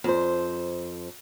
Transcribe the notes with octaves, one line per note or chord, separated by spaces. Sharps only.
F2 C5